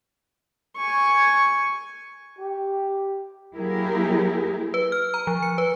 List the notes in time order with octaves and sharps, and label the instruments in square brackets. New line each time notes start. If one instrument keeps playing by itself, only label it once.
[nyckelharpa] G#5 C#6
[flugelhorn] G4
[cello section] F#3 A#3 E4 G4 G#4 A#4
[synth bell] B4
F6
A#5
F3
C#7
B4